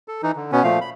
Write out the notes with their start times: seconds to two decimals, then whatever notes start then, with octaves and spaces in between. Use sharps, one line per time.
0.08 A4
0.23 E3 D#4
0.36 D3
0.52 B2 B3 C#4
0.64 A#2 F3 A3 F5
0.81 B5